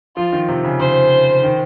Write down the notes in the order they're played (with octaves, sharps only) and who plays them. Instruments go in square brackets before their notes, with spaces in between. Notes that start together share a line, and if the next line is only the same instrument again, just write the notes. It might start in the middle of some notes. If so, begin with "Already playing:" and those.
[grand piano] F3 [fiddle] F4
[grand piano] D#3
C3
C#3
[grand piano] C#3 [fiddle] C5
[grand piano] D#3